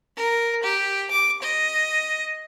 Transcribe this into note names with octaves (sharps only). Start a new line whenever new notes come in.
A#4
G4
D6
D#5